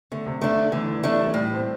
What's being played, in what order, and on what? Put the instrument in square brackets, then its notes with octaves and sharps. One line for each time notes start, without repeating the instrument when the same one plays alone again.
[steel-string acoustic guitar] D3 [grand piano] A3
[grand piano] C3
[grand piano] D3 [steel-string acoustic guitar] A3 D4
[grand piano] D3
[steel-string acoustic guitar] D3 [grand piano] E3
[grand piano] E3
[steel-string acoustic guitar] A3 D4
[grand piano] G3
E3
[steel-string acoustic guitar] A2 [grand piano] G3
[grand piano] C4